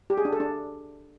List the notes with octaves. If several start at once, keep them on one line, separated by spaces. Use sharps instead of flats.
G4
G#4
D4
A4
D4